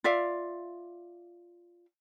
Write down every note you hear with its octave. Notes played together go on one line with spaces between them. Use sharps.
F4 D5 E5 F5